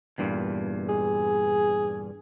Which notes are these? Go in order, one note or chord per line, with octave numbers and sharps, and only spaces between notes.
E2 G2 A#2
G#4